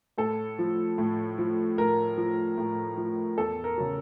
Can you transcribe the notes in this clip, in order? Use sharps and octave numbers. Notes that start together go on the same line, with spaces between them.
A2 A4
F3
A2
F3
A2 A#4
F3
A2
F3
E2 A4
A#4
C#3 F#3